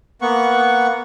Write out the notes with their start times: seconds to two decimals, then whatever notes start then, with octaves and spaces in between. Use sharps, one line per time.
0.22 A#3 B3 F#5 C#6